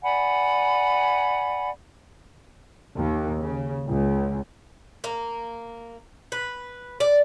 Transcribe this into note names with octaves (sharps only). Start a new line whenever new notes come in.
D5 F#5 G#5 B5
D#2
C#3
C#2
A#3
B4
D5